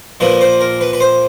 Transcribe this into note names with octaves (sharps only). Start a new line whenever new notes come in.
A#2 F3 A#3 B4
C5
A#4
B4
B4
C5